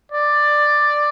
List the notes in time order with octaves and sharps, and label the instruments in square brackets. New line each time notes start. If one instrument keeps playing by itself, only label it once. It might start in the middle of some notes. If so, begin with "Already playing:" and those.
[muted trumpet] D5